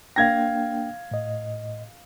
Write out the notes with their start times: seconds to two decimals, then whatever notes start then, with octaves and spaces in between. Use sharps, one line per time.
0.16 A#3 D4 F5 G5 G#6 A#6
1.11 A2 D#5